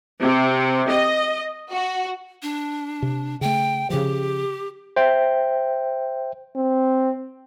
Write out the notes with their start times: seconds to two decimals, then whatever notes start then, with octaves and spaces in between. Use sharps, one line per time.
0.22 C3
0.91 D#5
1.71 F#4
2.43 D4
3.02 C3
3.41 C#3 A3 G5
3.90 C#3 F3 G4
4.96 C5 E5 G5
6.56 C4